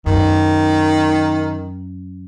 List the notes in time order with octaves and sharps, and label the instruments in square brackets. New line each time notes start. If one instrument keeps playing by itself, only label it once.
[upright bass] F#2 [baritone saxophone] D#3